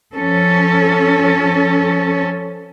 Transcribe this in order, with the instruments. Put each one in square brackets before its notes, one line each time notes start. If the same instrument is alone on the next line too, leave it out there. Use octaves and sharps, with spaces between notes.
[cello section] F3 C#4 A4